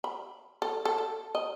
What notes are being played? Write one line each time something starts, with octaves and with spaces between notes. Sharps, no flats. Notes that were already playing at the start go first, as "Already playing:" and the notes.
B5
A4
A4
A4
D#5